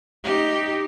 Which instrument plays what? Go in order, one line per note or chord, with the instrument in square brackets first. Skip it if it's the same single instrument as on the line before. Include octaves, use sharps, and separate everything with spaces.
[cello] D#4 G4